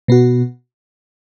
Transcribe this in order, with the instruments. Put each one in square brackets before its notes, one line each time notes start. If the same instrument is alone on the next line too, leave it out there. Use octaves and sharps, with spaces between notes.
[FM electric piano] B2 B3 F#4